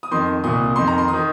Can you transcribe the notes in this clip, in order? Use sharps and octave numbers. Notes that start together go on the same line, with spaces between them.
D#6
F2 D#3 C6
C2 A#2 D#6
F2 D#3 C6
A#5
C6
D#6
D#3